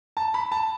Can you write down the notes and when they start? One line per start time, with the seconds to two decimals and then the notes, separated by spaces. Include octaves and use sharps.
0.17 A5
0.34 B5
0.52 A5